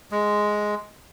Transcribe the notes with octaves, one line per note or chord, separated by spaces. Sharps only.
G#3